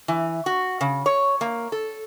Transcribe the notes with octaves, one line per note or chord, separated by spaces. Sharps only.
E3
F#4
C#3
C#5
A#3
A4